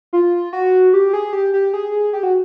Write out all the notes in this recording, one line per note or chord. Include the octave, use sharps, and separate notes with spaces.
F4
F#4
G4
G#4
G4
G4
G#4
G4
F#4